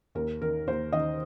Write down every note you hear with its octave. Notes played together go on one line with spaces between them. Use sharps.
D#2 A#4
D#3 A#4
D#2 C5
D#3 D#5